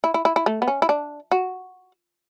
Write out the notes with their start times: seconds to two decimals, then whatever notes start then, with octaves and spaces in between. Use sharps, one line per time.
0.04 E4
0.14 E4
0.25 E4
0.36 E4
0.46 A3
0.62 B3
0.68 C#4
0.82 E4
0.89 D4
1.32 F#4